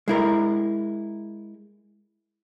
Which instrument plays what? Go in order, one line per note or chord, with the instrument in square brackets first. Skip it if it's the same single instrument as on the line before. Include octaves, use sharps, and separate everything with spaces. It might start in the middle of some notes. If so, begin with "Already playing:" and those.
[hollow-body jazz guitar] G#3 E4 A#4